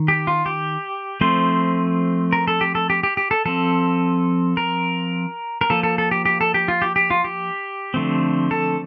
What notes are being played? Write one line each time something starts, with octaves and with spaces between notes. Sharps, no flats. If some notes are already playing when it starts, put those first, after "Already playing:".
Already playing: D#3
G4
F4
G4
F3 A3 C4 C5
A#4
A4
G4
A4
G4
G4
G4
A4
F3 C4 A4
A#4
A#4
F3 A#3 A4
A4
A4
G4
G4
A4
G4
F4
G4
G4
F4
G4
D3 F3 A3 C4
A4